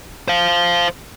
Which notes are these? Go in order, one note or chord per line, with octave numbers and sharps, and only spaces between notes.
C5 F5